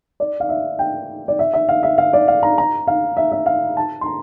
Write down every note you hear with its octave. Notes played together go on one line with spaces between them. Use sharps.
D5
F5
E5
G5
D5
E5
E5
F5
E5
F5
D5
F5
A#5
A#5
F5
E5
E5
F5
A5
C6
A#5